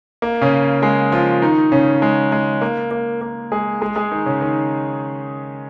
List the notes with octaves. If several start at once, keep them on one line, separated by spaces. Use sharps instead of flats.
A#3
C#3 C#4
G#3 G#4
F3 F4
D#3 D#4
C#3 C#4
G#3
G#3
A#3
A#3
A#3
G#3 G#4
G#3 G#4
G#3 G#4
D#3 D#4
C#3 C#4
D#3 D#4